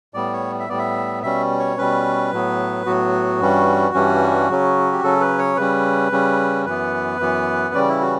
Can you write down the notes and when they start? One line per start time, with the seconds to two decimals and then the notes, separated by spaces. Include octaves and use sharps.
0.14 A2 G3 B3 D5
0.33 C#5
0.60 E5
0.68 A2 G3 B3 D5
0.79 E5
1.23 B2 G3 C#4 E5
1.59 C#5
1.77 B2 G3 C#4 B4
2.32 A2 F#3 B3
2.85 A2 F#3 B3 F#4
3.41 G2 E3 G3 C#4
3.94 G2 E3 G3 C#4
4.49 C#3 F#3 C#4
4.92 G4
5.02 C#3 F#3 C#4 A4
5.21 B4
5.39 C#5
5.57 C#3 G3 C#4 B4
6.12 C#3 G3 C#4
6.66 F#2 E3 B3 B4
7.19 F#2 E3 B3
7.74 C#3 E3 G3 C#4 D5
7.88 E4
8.01 F#4